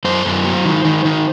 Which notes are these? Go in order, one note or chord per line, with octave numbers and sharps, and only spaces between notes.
F#2 C5
F#2
F#3
D#3
D#3
D#3